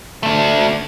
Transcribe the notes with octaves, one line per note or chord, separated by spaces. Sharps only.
A3 D4